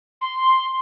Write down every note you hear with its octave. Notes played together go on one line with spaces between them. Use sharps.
C6